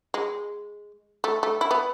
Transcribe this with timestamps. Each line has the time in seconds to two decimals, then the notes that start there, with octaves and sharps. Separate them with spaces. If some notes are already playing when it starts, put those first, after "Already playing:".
0.14 G#3
1.24 A3
1.43 A3
1.61 E4
1.71 B3